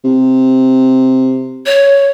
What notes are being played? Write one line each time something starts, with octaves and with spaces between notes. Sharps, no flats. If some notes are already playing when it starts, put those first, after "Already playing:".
C3
C#5